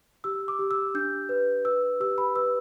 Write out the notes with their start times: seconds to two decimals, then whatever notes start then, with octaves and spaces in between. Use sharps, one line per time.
0.24 G4 E6
0.48 D6
0.59 G4
0.71 E6
0.95 D4 G6
1.29 B4
1.65 B4 E6
2.00 G4 E6
2.18 B5
2.35 B4 E6